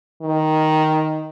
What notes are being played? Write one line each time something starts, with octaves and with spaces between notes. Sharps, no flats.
D#3